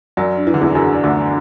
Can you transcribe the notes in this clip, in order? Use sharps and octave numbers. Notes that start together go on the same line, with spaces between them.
F#2 F#3 D5
D4
E3
D3 G#4
E2 E3
F#2 F#3 D4
D5
D2 D3
D4